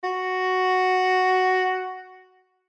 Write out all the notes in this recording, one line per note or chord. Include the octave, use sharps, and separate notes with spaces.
F#4